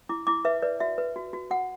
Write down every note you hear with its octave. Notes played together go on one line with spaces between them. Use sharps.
E4 D6
E4 D6
B4 E5
B4 D5
F#4 E5
B4
F#4
F#4
F#4 F#5